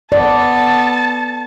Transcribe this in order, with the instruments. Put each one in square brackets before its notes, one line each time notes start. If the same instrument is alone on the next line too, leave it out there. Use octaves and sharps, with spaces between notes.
[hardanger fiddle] B3 A4 [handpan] D5 [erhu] A5